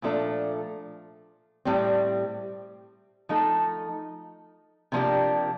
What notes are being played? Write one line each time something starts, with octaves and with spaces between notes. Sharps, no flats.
A#2 F3 A3 D4 A4
A2 G3 C4
F3 A3 D#4 A4
C3 F3 A#3 D4 G4